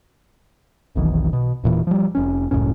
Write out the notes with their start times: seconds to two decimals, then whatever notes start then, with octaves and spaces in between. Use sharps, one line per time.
0.95 F1 B1 D#3 E3
1.33 B2
1.64 E1 A#2 E3
1.87 F3 G3
2.15 F1 C#4
2.51 F#1 C#2 A2 C#4